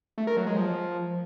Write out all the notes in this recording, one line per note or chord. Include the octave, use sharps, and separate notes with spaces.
A3
A#4
F#3
G#3
F3